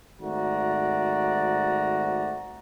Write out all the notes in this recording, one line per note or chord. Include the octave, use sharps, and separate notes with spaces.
G#1 A3 F#4 D5 A#5